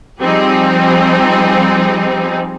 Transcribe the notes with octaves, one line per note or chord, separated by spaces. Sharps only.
F3 G3 C4 D#4 G#4